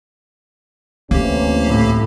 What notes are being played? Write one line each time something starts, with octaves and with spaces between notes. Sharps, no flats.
D2 C3 E3 A#3 C#4 G4
A2